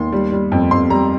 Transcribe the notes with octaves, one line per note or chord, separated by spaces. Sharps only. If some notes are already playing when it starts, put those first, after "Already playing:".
Already playing: D#2 C6
G3
G3
F2
F2 C6
G3 A#5